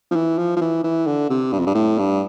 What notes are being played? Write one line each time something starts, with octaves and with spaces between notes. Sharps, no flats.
F3
E3
F3
F3
E3
E3
D3
C3
G2
F2
G2
A2
G2